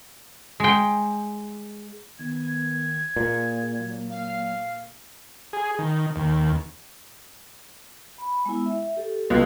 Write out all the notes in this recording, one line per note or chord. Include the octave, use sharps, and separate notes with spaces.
G#3 G5
D#3 B3 G#6
A#2 A#3 G#4
F#3
F5
G#4
D#3
D#2
B5
G#3 B3 E4
E5
G4 A4
C#2